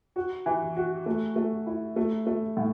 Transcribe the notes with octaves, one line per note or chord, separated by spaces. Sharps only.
F#4
E3
F#4
A3
A3
E4
A3
A3
A2